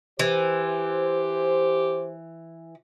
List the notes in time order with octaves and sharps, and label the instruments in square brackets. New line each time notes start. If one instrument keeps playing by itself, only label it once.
[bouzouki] E3 [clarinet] G4 [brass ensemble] C5